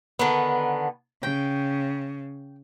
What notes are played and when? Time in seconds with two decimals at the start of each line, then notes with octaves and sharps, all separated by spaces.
0.19 D3 D#3 B3
1.23 C#3 G5